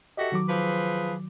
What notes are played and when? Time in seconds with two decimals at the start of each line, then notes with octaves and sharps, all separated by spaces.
0.17 F#4 G4 A4 D#5 E5
0.32 D#3 F#3 D6
0.49 F3 G#4 B4